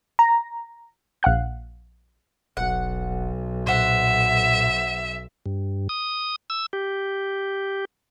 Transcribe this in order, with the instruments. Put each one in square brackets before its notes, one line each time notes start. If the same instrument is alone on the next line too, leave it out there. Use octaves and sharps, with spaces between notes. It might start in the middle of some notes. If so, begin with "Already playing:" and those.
[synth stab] A#5
[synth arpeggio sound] A#1 F5 F#5 F#6
[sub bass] E1 [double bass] B1 [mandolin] F#5
[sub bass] A#2 [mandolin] C5 F#5 [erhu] E5
[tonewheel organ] G2
D#6
E6
G4